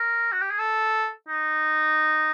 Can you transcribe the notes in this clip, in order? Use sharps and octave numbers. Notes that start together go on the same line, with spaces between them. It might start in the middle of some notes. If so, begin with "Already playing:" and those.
Already playing: A#4
F#4
G4
G#4
A4
D#4